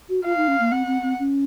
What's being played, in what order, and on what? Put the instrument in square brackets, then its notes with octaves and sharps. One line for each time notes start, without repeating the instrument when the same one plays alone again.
[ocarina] F#4
[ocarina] F4 [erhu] F5
[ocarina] D#4
C#4
A#3
[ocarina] C4 [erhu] F#5
[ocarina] C4
C4
C#4